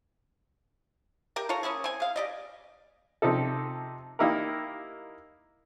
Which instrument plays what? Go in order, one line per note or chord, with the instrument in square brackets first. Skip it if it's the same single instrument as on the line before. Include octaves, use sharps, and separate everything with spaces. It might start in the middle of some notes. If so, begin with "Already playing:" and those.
[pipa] G4 A#4 G5
F4 A4 C#5 A#5
A#3 C#4 E4 G#4
C4 G#5
G#4 F5
G4 D5 D#5
[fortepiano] C3 F3 D#4 A4
A#3 D#4 E4 G4 A#4